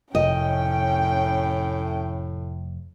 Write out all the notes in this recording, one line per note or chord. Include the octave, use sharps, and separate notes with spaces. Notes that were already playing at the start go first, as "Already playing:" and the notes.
F1 A2 C#4 D#5 G5